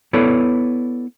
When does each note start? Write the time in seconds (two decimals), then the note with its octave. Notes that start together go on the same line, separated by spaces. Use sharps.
0.13 B3 E4 A4 B4 C#5 D5